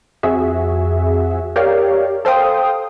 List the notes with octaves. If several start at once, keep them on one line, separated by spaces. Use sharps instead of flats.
F2 F#4 G#4 E5
G4 A#4 C#5 D5 F5
A4 C5 F5 G5 D#6